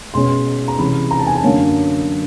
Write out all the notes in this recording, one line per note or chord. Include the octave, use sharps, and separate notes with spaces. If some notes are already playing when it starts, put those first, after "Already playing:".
B2 G#3 C#4 C6
A#5
C3 E3 G#3 C#4 B5
A#5
A5
G#5
A5
F#2 D3 F#3 A#3 C#4